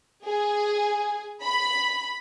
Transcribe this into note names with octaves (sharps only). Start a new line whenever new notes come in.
G#4
B5